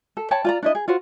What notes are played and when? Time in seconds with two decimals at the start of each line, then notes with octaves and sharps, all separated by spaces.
0.17 A4
0.31 C#5 G5 A5 B5
0.45 F4 D5 A#5
0.63 D4 E4 D#5
0.75 G#4
0.88 F4 F#4 C5